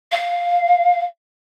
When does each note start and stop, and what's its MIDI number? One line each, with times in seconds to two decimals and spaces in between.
0.11 1.02 77